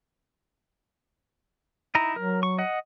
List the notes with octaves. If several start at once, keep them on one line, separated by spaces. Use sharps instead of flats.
D#4 E4 A#5
F#3 A#4
C#6
D#5 F#5